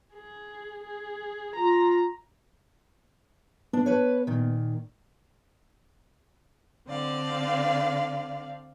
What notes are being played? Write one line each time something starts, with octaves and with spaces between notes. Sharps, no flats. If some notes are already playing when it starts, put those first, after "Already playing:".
G#4
G#4
F4 A#5
B3 D4
B4 C#5
A#2 D#3
D3 C4 D5 F5